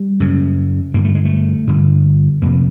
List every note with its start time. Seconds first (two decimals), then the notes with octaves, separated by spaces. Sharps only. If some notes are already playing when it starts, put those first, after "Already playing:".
Already playing: G3
0.20 F#2 C#3
0.94 G2 D3 A#3
1.04 A3
1.15 G#3
1.25 A3
1.67 G2 D3
2.42 F2 C3 A#3